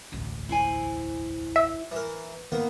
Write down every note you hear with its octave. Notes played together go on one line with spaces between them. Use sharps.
E1 A1 D2
E4 C5 G#5
E5
E3 A#4
D#3 A#3 B3